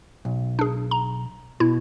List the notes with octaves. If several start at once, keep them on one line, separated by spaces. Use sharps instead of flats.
B1
D4 G#4
A#5
B2 E4